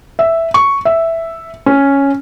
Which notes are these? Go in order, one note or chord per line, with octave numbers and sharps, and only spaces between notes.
E5
C#6
E5
C#4